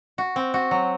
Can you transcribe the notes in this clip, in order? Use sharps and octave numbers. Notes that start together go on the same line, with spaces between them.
F#4
C4
F#4
F#3